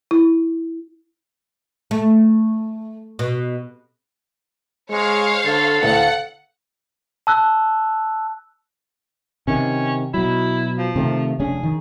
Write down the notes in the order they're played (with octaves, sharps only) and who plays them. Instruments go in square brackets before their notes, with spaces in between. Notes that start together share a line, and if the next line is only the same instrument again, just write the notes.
[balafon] E4
[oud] A3
B2
[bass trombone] G#3 [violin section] C5 C#5 F5
[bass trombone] D3 [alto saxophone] A4
[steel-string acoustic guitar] D2 F5 [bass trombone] A2 [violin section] F#5
[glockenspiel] A5 E6 F#6
[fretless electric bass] C3 D#3 [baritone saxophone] C#4
[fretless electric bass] B2 F#3 [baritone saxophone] E4
[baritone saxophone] F3
[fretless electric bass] C3 D#3 A3
[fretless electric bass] F1 C#4 D4 [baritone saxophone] G#4
[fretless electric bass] D#3